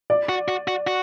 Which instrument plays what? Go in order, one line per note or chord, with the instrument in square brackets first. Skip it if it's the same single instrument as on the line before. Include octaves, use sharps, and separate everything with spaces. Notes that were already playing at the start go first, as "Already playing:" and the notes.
[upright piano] D5
[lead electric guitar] F#4
F#4
F#4
F#4